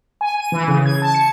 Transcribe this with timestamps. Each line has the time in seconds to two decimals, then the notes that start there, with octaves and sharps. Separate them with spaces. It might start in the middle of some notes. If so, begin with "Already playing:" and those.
0.21 G#5
0.40 D#7
0.52 E3
0.68 C#3
0.86 G#6
1.02 A5
1.15 C#7